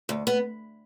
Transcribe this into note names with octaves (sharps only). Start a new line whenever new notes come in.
D2
B3